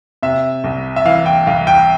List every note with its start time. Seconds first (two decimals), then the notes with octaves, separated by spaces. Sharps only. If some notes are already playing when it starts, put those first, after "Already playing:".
0.23 C3 E5
0.64 C2
0.96 E5
1.05 E3 F5
1.26 G5
1.47 C2 F5
1.67 G5